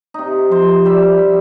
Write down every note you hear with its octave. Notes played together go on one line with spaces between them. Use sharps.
C3 D#4
F3 C5
G3 E5